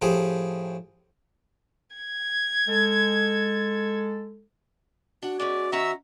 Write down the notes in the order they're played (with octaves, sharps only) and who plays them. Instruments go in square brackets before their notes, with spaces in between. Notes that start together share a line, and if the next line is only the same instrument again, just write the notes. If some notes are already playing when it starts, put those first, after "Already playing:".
[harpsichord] A2 F3 G4 G#4
[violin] G#6
[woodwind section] G#3 A4
[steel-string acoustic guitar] D4 F#5 [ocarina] F#4
[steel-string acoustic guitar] G#3 B3 C#4 [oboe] D5
[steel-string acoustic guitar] D#3 C#4 F#5 [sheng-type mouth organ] E5 E6 [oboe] A#5